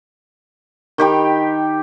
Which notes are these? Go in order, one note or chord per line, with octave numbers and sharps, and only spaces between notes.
D#3 G4 G5 B5